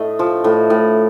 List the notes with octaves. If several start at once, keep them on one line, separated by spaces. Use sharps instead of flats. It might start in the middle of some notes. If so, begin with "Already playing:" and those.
Already playing: A2 A3 D#5
F3
A2
A2